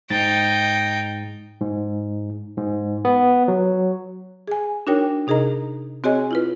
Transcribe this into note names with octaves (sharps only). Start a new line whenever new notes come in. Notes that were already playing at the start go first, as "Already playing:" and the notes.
G#2 D#4 G5 A6
G#2
G#2
B3
F#3
G#4 G#5
D4 D#4 F#4 A#4 C#5 G5
C3 D#4 G#4 A#4 D#5 A#5
C4 F#4 G#4 C#5 D#5 G#5
E4 F4 B4